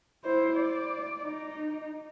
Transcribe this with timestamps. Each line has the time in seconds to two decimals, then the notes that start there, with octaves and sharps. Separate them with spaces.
0.24 E4 C5
0.57 D5
1.22 D#4